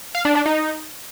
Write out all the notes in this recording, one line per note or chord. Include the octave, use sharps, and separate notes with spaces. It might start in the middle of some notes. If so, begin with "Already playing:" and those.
F5
D4
D4
D#4